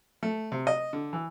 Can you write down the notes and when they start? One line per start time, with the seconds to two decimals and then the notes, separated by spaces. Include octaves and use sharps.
0.23 A3
0.52 C3
0.67 D#5
0.93 D3
1.13 E3